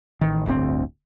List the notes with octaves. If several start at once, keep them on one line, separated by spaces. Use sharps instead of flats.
A1 D#3
D1 G1 D2 C4